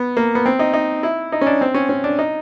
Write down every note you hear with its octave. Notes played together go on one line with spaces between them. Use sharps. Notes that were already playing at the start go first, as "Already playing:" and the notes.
Already playing: B3
A#3
B3
C4
D#4
D#4
E4
D#4
C#4
D4
C4
C#4
C#4
D4
D#4